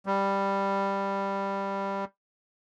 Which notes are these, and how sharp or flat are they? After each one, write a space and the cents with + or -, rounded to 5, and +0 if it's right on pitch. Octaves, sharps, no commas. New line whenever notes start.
G3 +5